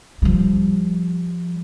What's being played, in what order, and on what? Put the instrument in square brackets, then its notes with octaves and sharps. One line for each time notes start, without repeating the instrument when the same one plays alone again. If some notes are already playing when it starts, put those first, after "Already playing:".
[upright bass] F3 G3